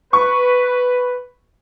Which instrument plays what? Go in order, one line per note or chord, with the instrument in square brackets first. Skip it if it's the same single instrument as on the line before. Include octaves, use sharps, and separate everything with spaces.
[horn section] B4 [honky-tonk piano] C#6